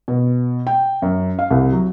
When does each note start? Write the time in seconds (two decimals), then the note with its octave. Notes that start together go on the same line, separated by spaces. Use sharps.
0.08 B2
0.67 G5
1.02 F#2
1.39 F5
1.50 C2
1.72 F#3